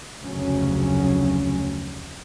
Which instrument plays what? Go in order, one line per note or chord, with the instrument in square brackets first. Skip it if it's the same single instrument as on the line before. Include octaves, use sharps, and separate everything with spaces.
[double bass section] F1 D2 C#3 F#3 C#4